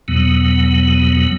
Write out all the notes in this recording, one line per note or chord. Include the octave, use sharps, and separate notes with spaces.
E2 B2 F#3 B3